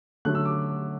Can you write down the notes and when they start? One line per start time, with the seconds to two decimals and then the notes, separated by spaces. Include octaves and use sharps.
0.25 D3 F#3 A3 F#6
0.35 E6
0.45 D6